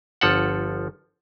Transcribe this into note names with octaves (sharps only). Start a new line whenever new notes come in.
G1 F3 A4 F#5